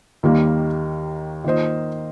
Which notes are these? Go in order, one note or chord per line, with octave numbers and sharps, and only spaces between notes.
D#2 D#3 G3 A#3
D#3 A#3 F4 C5 D#5